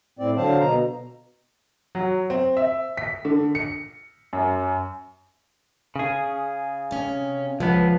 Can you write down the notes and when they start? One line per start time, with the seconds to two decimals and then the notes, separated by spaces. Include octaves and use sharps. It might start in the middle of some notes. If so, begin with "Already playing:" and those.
0.19 A2 C4 D5
0.38 D3 F#3 C5 F5 A5
0.60 B2 A#5
1.95 F#3
2.30 C4
2.57 E5
2.97 B6
3.25 D3
3.55 C#7
4.33 F#2
5.96 C#3 G#4
6.91 C3 C#4
7.60 C#2 F3 B3